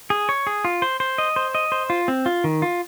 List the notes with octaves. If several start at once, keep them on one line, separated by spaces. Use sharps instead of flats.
G#4
C#5
G#4
F4
C5
C5
D#5
C5
D#5
C5
F4
C4
F4
D#3
F4